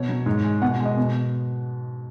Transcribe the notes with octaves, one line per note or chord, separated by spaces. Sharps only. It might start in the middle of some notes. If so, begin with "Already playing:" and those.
Already playing: B2 C#5
F#3
G#2
G#3
B2 F#5
F#5
G#3
D#5
B2